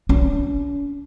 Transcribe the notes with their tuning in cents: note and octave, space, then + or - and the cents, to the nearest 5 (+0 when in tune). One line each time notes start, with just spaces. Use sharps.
C#4 +45